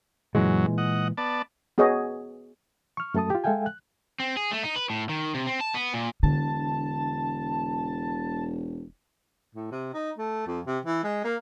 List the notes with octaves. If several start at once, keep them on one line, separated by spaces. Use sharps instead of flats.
F#2 A#2 E3 F#3 G#3
D#5 F#5
B3 D5 A5
B3 F#4 G#4 C#5 D#5
C#6 F6
F#2 A3 A4 A5 D#6
F4 G4
G#3 A4 E5 F5 G5 G#5
F#6
C4
G#4
A3
D#4
B4
A2
D#3
C3
C4
A5
B3
A#2
E1 D3 A5
A2
C3
D#4
A3
F2
C3
E3
G#3
A#3